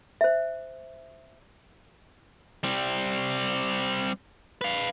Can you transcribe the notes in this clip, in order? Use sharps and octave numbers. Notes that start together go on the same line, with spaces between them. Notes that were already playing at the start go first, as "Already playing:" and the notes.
C5 E5
G3 C4
B4 F5